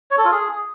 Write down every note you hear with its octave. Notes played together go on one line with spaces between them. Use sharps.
C#5
A4
F4
G#4